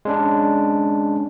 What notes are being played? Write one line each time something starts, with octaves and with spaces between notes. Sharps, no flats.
G#3 C#4 D4